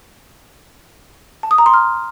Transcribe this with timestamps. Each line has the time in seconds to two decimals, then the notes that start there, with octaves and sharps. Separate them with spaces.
1.43 A5
1.51 D#6
1.58 A#5
1.66 C6
1.74 F6